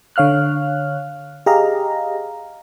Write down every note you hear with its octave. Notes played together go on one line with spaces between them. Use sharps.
D3 C#5 F5 F6 F#6
G4 G#4 D#5 F5 A#5